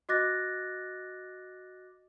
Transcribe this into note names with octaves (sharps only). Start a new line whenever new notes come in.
F#4 D#5 D6 F#6 A6 A#6